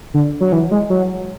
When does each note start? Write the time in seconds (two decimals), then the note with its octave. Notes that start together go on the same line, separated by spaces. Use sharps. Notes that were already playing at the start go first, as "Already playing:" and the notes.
0.14 D3
0.41 F#3
0.52 E3
0.71 G#3
0.90 F#3